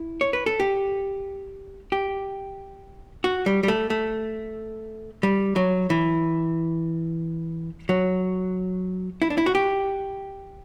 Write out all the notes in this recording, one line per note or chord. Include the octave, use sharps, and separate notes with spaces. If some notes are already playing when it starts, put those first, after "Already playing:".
Already playing: E4
C#5
B4
A4
G4
G4
F#4
G3
G3
A3
A3
G3
F#3
E3
F#3
E4
D4
E4
F#4
G4